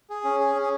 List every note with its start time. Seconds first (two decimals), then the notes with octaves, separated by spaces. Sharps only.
0.10 G#4
0.24 C#4
0.40 G#4
0.55 C#4
0.62 G#4